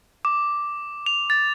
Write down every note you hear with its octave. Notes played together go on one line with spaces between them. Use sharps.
D6
F7
A6